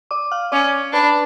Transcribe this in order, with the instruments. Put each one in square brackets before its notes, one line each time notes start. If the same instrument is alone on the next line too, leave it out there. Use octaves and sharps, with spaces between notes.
[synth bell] D5 D6
F5 F6
[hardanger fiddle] C#4 [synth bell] D5 D6
[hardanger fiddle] D4 [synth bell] B4 B5